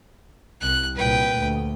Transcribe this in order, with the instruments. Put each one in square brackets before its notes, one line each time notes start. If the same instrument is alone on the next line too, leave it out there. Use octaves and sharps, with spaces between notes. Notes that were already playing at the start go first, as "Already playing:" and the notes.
[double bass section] C2 [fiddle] F#6
[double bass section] C2 A#2 [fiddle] B4 G5
[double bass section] D2